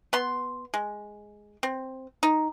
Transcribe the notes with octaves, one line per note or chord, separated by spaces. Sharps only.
B3 C6
G#3
C4
D#4